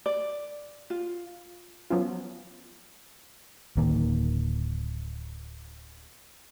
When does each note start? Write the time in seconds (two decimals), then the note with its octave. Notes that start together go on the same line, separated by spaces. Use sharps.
0.06 D5
0.90 F4
1.90 F3 F#3 B3 C#4 F4
3.77 D1 D#3 A#3